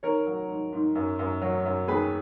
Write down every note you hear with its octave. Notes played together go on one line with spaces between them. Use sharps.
D#3 A#4 C#5
F#3
G#2
G#2
F#2
F#2
F#3
F#2
D#2 G#4 B4